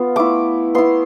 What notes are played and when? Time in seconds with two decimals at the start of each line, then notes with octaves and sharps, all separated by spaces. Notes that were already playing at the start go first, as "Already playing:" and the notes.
Already playing: B3 F4
0.16 A3 E4 D6
0.75 B3 E4 C6